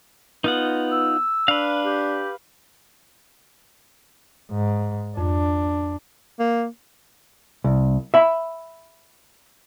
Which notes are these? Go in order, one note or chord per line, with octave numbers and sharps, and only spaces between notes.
B3 D#4 F4 F#5
E6
D4 B4 F5
G4
G#2
F2 D4
A#3
C2
E5 B5